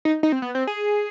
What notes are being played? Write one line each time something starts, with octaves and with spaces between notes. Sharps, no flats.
D#4
D#4
C4
B3
C4
G#4